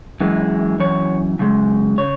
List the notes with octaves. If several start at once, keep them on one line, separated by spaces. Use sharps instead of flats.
F#2 E3 G#3
F#2 E3 C#5
F#2 C#3 G#3
C#3 C#5